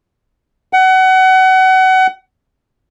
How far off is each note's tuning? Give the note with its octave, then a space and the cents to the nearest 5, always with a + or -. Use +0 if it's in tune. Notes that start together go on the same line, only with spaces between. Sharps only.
F#5 +25